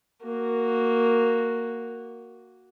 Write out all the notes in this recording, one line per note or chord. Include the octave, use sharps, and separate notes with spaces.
A#3 F#4